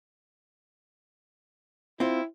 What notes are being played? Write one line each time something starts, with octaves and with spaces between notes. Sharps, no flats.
C4 E4 F4